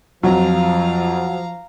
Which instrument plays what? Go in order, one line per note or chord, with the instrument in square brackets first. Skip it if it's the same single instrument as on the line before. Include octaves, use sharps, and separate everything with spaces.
[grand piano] F2 [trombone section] F3 [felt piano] F#3 [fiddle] F5 A#5